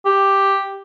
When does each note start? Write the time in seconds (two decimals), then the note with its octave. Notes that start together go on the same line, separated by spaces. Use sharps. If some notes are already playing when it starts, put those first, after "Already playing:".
0.06 G4